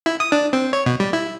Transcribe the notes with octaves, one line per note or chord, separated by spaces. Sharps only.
E4
D#6
D4
C4
C#5
B2
G3
E4